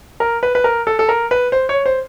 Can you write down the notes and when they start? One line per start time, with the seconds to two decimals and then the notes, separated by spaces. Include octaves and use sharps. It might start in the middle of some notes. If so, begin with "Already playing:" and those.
0.20 A#4
0.43 B4
0.55 B4
0.64 A#4
0.87 A4
0.99 A4
1.09 A#4
1.31 B4
1.52 C5
1.69 C#5
1.86 C5